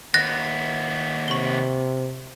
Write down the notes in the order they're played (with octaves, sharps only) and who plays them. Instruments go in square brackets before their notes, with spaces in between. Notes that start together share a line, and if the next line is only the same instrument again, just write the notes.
[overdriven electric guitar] D#2 B3 [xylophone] F#6 A6 A#6
[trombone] C3 [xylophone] C#6 G7